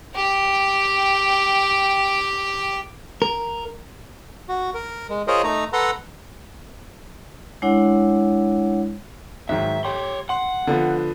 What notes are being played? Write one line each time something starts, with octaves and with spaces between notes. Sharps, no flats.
G4 G5
A#4
F#4
A#4
G#3
F4 G#4 A#4 C5 C#5 D#5
A3 D#4 A#5
A4 B4 F#5 A#5 C6
G#3 D4 E4 C#5 F#5
G#2 D#3 F#3 E5
G4 C#5 C6
F#5 C6 F#7
D3 F3 B3